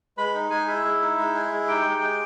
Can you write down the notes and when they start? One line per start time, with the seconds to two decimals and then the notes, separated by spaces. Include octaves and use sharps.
0.17 G#3 B4 B5
0.34 D#4
0.50 G#3 G#4 G#5
0.67 E4 G#4 E5
0.84 G#3
1.01 D#4
1.18 G#3
1.34 G#4
1.52 G#3
1.68 D#4 G4 G5
1.86 G#3
2.01 G#4